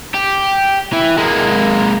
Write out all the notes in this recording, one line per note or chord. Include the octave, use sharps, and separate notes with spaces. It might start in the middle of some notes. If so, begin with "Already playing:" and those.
G4
E3
G#3 A#3